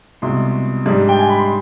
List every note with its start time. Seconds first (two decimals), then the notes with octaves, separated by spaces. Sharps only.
0.22 C2 B2 G#3 C6
0.86 G#2 G3 D4
1.09 G5
1.19 G#5
1.29 B5
1.39 C6